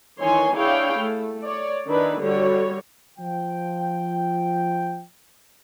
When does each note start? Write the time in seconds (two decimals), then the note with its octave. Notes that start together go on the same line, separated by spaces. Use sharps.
0.19 D#3 E3 C#5 G#5 C6
0.54 D4 E4 G#4 C#5 F5 G5
0.98 A3
1.43 C#5 D5
1.87 D#3 D4 E4 B4
2.20 D3 G3 F#4 C#5
3.19 F3 G5